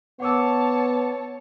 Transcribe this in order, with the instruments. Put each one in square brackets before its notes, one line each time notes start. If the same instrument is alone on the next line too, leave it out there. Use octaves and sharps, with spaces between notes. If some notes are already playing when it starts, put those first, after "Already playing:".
[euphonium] B3 [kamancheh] C#5 A5 [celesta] F#5 D6 E6